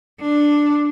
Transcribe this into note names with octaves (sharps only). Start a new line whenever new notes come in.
D4